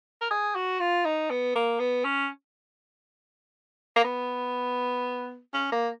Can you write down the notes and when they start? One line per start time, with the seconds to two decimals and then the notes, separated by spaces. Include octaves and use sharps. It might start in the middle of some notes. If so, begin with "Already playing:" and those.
0.21 A#4
0.31 G#4
0.55 F#4
0.80 F4
1.05 D#4
1.30 B3
1.56 A#3
1.80 B3
2.05 C#4
3.96 A#3
4.04 B3
5.54 C#4
5.72 A#3